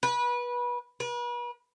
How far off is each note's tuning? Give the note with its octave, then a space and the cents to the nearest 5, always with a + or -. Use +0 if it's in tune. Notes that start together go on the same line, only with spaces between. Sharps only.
B4 -25
B4 -40